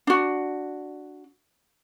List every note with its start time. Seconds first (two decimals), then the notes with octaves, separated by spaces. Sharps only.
0.07 D4 F#4